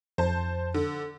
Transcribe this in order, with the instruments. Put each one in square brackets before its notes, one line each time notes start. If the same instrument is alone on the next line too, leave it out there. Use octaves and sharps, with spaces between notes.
[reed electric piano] F2 [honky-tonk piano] C5 A5
[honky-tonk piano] D3